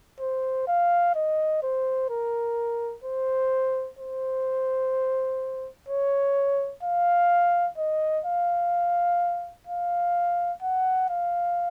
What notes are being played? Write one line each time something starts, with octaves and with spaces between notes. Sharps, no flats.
C5
F5
D#5
C5
A#4
C5
C5
C#5
F5
D#5
F5
F5
F#5
F5